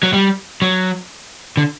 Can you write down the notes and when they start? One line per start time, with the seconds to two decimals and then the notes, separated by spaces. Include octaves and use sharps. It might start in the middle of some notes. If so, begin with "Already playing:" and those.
0.03 F#3
0.13 G3
0.62 F#3
1.57 D3